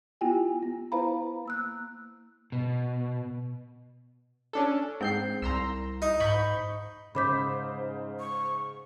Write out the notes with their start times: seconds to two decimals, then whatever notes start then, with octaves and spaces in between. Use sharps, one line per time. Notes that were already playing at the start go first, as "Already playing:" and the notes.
0.21 B3 E4 F4 G4 G5 G#5
0.62 B3
0.92 E4 B4 C5 F5 A#5 B5
1.45 A#3 E6 F#6
2.52 B2
4.53 C#4 D4 A4
5.01 G#2 C4 G6 C7
5.42 C2 A#5 C6 E6
6.02 D#4
6.20 G#2 B5 C#6 G6
7.15 G#2 C#3 C5 B5 D6 G6 B6
8.19 C#6